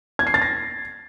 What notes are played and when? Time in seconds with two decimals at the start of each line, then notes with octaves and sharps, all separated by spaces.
0.19 G#6
0.27 C7
0.34 A6
0.42 A#6